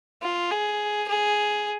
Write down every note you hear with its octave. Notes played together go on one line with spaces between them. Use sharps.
F4
G#4
G#4